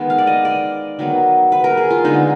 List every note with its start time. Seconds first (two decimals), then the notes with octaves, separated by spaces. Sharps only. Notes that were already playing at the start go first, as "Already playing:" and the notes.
Already playing: D#3 G#3 B3
0.10 F5
0.18 D5
0.27 D#5
0.45 D5
0.99 D#3 F#3 B3
1.52 B4
1.64 A#4
1.77 G#4
1.90 F4
2.04 D3 G#3 B3 D#4